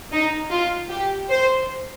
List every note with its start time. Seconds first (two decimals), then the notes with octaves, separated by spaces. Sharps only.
0.12 D#4
0.51 F4
0.90 G4
1.30 C5